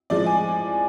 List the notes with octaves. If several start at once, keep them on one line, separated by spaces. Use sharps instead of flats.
A2 F3 G#3 D5
G#5